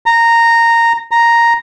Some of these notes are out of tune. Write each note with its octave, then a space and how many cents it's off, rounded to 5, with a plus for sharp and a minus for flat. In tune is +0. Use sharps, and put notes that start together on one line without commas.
A#5 -10
A#5 +0